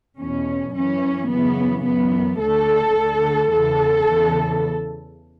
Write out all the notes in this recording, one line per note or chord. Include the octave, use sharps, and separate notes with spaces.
E2 B2 C#4
F#2 E3 C#4
F#2 C#3 E3 B3
F#2 E3 B3
D2 D3 A4
D2 D3
E2 C#3 E3 A4
E2 C#3 E3